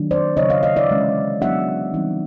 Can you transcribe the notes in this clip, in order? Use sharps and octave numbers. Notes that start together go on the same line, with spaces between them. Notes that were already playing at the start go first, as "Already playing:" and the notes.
Already playing: D#3 F#3 A#3 D4
C5 D5
C#3 F#3 A#3 C#5 D#5
D#5 F5
D#5 F5
D5 E5
C3 E3 G#3 C#4
F#3 B3 D4 E5 F#5
E3 G3 C4 D#4